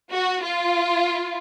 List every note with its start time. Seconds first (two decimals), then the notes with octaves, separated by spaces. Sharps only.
0.12 F#4
0.43 F4